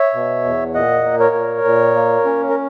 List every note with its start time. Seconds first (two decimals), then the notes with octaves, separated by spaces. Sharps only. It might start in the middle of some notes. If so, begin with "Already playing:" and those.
Already playing: C#5 E5
0.14 B2
0.44 E2
0.74 A#2 D#5 F#5
1.04 A#3
1.19 A#4 C#5
1.35 A#2
1.64 A#2
1.96 A#3
2.25 C#4
2.49 A#4